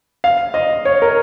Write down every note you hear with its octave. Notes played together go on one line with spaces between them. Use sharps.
F5
D#5
C#5
A#4